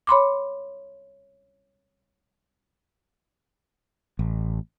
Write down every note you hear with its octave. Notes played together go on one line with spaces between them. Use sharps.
C#5 B5 C6 D6
A1